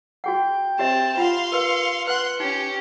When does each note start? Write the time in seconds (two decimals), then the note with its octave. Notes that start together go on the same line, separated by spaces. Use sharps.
0.24 F#4 G#4 F#5 G5
0.79 C4 G4 C#5 E5 A5
1.17 F4 F5 F#5 C6
1.52 A#4 B4 C#7
2.07 B4 F#5 C6 F#6
2.40 C#4 D#4 G4